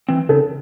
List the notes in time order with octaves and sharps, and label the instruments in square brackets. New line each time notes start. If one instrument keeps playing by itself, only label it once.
[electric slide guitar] E3 C4
[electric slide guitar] C#3 [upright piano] A4